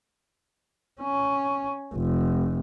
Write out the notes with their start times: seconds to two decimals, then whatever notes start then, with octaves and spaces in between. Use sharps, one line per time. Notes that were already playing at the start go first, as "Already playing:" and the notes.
1.01 C#4
1.94 F1